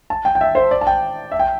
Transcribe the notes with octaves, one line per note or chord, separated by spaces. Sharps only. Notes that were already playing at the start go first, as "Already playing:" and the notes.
A5
G5
G5
E5
C5
D5
A5
G5
E5
G5